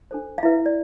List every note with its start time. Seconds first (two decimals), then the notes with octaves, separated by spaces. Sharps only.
0.11 D4 A4 C5
0.38 F5
0.43 E4 B4 E5
0.66 D5